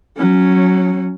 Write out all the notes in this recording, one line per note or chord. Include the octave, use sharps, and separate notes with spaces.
F#3 C#4